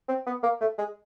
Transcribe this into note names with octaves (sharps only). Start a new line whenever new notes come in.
C4
B3
A#3
A3
G#3